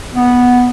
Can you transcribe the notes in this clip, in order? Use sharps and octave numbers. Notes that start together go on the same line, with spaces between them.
B3